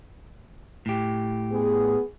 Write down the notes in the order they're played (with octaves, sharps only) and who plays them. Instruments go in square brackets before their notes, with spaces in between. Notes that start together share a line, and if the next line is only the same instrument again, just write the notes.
[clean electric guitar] A2 G4
[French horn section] B3 G#4